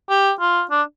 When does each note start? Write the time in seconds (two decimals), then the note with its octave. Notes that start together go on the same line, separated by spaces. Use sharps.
0.10 G4
0.40 F4
0.71 D4